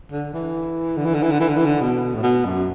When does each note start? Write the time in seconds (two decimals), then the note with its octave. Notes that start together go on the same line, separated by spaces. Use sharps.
0.12 D3
0.34 E3
0.97 D3
1.05 E3
1.14 D3
1.23 E3
1.31 D3
1.40 E3
1.49 D3
1.57 E3
1.65 D3
1.81 B2
2.15 A2
2.23 B2
2.45 F#2